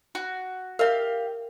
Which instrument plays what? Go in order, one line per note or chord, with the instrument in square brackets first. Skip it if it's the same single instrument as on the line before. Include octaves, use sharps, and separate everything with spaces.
[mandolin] F#4
[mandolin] G4 F5 [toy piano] A#4 E5